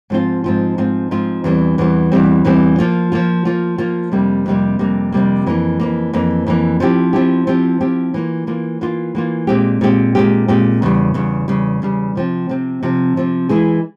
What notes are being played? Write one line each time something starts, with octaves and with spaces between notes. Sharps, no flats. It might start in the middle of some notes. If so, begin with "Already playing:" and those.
G#2 F3 C4 F4
G#2 F3 C4 F4
G#2 F3 C4 F4
G#2 F3 C4 F4
E2 E3 G3 C4
E2 E3 G3 C4
E2 E3 G3 C4
E2 E3 G3 C4
F3 A#3 F4
F3 A#3 F4
F3 A#3 F4
F3 A#3 F4
F2 C3 G3 A#3
F2 C3 G3 A#3
F2 C3 G3 A#3
F2 C3 G3 A#3
F2 E3 A#3
F2 E3 A#3
F2 E3 A#3
F2 E3 A#3
F3 C4 E4 G4
F3 C4 E4 G4
F3 C4 E4 G4
F3 C4 E4 G4
E3 A#3 F4
E3 A#3 F4
E3 A#3 F4
E3 A#3 F4
A#2 G#3 C4 G4
A#2 G#3 C4 G4
A#2 G#3 C4 G4
A#2 G#3 C4 G4
E2 C#3 G3
E2 C#3 G3
E2 C#3 G3
E2 C#3 G3
C3 F3 C4
C3 F3 C4
C3 F3 C4
C3 F3 C4
E3 G#3 E4 G#4